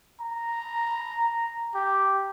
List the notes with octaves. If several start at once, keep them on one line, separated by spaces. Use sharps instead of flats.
A#5
G4